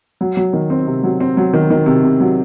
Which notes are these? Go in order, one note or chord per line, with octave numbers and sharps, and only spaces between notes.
F#3
F#3
D#3
C4
C3
F#3
C4
F#3
D#3
D#3
C3
C3
F#3